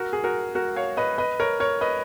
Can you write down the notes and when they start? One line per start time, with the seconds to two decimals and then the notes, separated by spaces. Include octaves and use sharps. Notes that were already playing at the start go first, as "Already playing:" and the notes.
Already playing: F#4 A#4
0.13 G#4
0.24 F#4 A#4
0.55 F#4 A#4
0.76 C#5 F5
0.97 B4 D#5
1.18 B4 D#5
1.40 A#4 C#5
1.60 A#4 C#5
1.81 B4 D#5